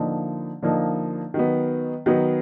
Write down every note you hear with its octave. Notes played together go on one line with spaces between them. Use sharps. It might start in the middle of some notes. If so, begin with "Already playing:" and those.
Already playing: D3 F3 A#3 D#4
D3 F3 A#3 D#4
D#3 F#3 B3
D#3 F#3 B3